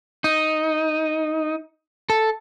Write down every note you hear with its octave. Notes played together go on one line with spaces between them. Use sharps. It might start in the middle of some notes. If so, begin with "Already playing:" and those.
D#4
A4